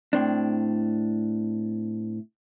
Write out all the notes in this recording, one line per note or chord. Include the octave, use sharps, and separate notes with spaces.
A2 C4 D4